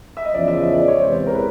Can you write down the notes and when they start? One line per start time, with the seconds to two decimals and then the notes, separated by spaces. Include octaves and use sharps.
0.17 E5
0.25 D#5
0.34 E2 C#3 F3 D5
0.48 E5
0.61 D#5
0.74 D5
0.88 C#5
1.00 E2 C3 E3 G#3 C5
1.27 A#4
1.34 B4